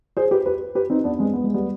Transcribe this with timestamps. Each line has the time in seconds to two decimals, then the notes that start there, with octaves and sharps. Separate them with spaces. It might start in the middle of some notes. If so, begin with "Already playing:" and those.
0.17 G#4 C5
0.31 G4 B4
0.46 G4 B4
0.75 G4 B4
0.90 C4 D#4
1.04 B3 D4
1.19 G#3 C4
1.33 B3
1.44 G#3
1.54 G3 B3